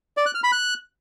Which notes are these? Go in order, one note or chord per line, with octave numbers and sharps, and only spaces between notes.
D5
F#6
F6
B5
F#6